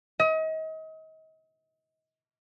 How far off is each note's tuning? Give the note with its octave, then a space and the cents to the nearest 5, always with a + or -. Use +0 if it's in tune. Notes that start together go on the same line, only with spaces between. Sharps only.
D#5 +35